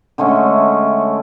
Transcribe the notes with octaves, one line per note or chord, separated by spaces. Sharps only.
D3 G#3 A3 C#4